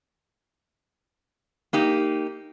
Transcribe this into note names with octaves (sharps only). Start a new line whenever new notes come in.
A#3 D#4 G4